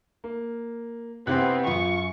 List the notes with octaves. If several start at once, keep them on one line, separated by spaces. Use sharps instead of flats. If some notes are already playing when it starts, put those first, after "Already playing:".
A#3
C3 B3 C4 E4 G4 G#4 B4 F#6
F#2 F4 G#4 C#6